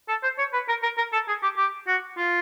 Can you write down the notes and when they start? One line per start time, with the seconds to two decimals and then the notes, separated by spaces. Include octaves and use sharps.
0.09 A4
0.23 C5
0.38 C#5
0.53 B4
0.68 A#4
0.83 A#4
0.98 A#4
1.13 A4
1.28 G#4
1.43 G4
1.57 G4
1.87 F#4
2.17 F4